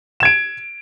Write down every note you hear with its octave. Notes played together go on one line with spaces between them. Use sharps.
G#6 D7 E7